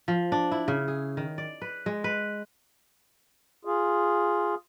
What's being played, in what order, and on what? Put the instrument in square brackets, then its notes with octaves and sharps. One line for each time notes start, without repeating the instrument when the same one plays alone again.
[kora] F3
D4
E4
C#3
G#4
D#3
D5
B4
G#3
B4
[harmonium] F4 G#4